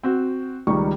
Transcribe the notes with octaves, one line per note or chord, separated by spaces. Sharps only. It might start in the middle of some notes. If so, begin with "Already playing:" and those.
C4 F#4
C#2 D#3 G3 C#6